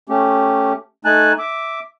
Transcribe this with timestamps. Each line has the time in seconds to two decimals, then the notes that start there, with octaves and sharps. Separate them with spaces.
0.09 A3 C#4 G4
1.05 A3 D#4 G#5 A5 F#6
1.39 E5 D6